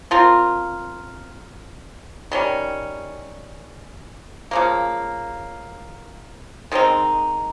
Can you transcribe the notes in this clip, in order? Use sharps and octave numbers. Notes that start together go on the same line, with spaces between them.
F3 C4 F4 A#4
D#3 G3 C#4
C#3 F3 A#3
D#3 G#3 C4 D#4